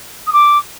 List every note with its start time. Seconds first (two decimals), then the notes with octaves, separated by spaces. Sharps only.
0.27 D#6
0.33 D6